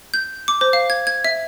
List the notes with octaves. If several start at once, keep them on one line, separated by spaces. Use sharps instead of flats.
G6
D6
C5
F5
G#6
G#6
E5